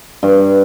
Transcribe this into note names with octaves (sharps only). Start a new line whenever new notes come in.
G2